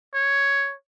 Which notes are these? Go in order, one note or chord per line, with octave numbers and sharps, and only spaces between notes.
C#5